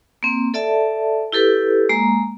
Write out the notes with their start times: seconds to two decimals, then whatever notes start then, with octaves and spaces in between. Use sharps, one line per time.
0.23 A#3 C4
0.54 A4 D5 E5 A5
1.32 E4 G4 A4 B4
1.89 G#3 A#3 A#5